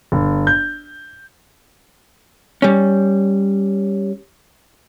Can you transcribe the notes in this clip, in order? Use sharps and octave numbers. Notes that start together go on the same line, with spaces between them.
G1
G6
G3 C#4